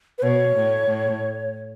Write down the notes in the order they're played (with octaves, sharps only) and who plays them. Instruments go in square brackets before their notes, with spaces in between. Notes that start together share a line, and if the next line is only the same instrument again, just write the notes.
[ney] B4
[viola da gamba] B2 [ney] C#5
[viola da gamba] A2
A2